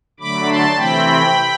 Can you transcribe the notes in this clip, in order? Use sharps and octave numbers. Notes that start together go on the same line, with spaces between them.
D3 F#3 A3 B5 D6
A5 C6
C3 E3 A3 C4 E4 G5 B5